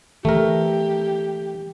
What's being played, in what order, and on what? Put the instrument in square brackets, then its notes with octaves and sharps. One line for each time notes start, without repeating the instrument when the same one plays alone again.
[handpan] E3 [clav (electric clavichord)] A3 A#4 [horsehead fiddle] G4